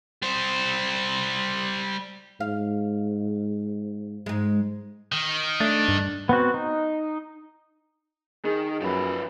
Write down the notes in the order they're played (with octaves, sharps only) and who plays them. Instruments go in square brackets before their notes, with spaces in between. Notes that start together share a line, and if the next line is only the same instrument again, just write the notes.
[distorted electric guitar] G3 C5
[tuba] G#2 [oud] F5
[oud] G#2 G#3
[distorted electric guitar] D#3
[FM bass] A3 [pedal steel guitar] D4
[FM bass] G2
[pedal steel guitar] B3 C4 F#4
D#4
[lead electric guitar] D#3 [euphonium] G#4
[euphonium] F#2 [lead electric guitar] F3 B4